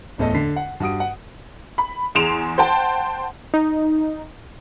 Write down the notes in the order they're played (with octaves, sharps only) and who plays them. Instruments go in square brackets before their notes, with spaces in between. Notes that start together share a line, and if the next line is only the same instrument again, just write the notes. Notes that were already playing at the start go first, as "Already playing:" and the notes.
[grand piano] D1 E2 A2 A4 D#5
D3 B6 C7
F#5
G2 F#4 D#6 D7
F#5
[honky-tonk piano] B5
E2 G#4 C6 D7 E7 F7
C5 F#5 G5 A5
[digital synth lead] D#4